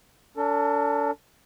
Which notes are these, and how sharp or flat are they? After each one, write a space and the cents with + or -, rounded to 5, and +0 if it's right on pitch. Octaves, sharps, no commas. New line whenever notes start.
D4 -40 A4 +35